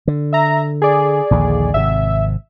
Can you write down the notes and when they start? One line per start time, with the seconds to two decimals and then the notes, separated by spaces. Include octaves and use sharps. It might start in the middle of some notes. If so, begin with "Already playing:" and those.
0.07 D3
0.33 E5 A#5
0.82 G#4 D5
1.31 A#1 D#2 D3
1.74 G#1 C3 E5